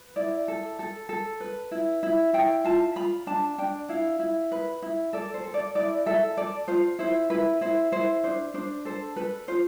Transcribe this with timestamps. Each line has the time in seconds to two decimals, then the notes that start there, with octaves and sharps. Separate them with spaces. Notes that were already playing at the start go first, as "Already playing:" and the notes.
Already playing: B4
0.16 E4 D5
0.48 A4
0.79 A4
1.09 A4
1.40 B4
1.71 E4
2.03 E4
2.33 E4 G5
2.64 F4 A5
2.96 F4 B5
3.27 D4 A5
3.58 D4 G5
3.89 E4 F5
4.19 E4
4.52 B4
4.82 E4
5.13 A4 D5
5.34 C5
5.44 A4
5.54 D5
5.75 E4 D5
6.06 A4 E5
6.37 A4 D5
6.68 F4 C5
6.99 E4 C5
7.30 E4 B4
7.61 E4 C5
7.92 E4 C5
8.24 D4 C5
8.54 D4 C5
8.85 A4 C5
9.16 A4 B4
9.48 F4 C5